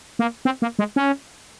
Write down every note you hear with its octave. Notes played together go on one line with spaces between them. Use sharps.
A#3
C4
A#3
G#3
C#4